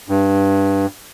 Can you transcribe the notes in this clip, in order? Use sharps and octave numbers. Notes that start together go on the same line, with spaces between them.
G2